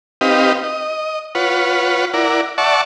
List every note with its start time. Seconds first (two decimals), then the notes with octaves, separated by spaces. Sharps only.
0.21 C4 D#4 G4 B4 D#5 F5
0.63 D#5
1.35 F4 B4 C#5 F#5
2.14 E4 A#4 D5 F#5
2.58 D5 E5 F#5 A5 C#6